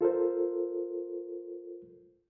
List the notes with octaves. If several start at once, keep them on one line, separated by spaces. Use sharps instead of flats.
F4 A4 A#4 C5